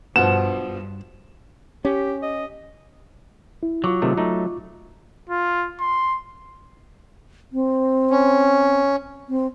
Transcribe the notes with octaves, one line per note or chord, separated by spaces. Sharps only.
G2 B2 F3 F#5 E7
C#4 G4
D#5
E4
F#3 F4 C#6 D6
C3 D#3 A3
A3 D#4
F4
C6
C4
C#4
C4